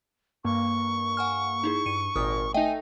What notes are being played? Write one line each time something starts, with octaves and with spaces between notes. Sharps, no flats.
G2 A#3 C#6
F#5 G#5 F6
D#4 E4 G#4
G2 C#7 D#7
G#1 A#2 A#4 D#6
A3 D#4 D#5 E5 G5 G#5